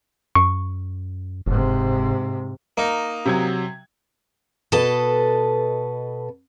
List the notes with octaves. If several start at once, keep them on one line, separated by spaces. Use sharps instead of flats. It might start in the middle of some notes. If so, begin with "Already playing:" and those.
F#2 C#6
F#1 G#2 C3
A#3 D#4
C3 F#3 G#6
B2 A4 B4 D#5 A5